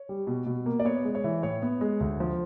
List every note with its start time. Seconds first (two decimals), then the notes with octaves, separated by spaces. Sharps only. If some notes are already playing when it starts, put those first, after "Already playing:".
Already playing: C#5
0.09 G3
0.27 B2
0.46 B2
0.66 A#3
0.80 D5
0.85 B3 C#5
1.04 G#3
1.15 C#5
1.24 E3
1.42 A2 C#5
1.62 B3
1.81 G#3
2.00 D2
2.20 F3